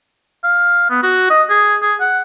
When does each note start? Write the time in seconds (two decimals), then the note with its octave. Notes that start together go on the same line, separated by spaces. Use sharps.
0.44 F5
0.90 B3
1.03 F#4
1.30 D#5
1.50 G#4
1.82 G#4
2.00 F#5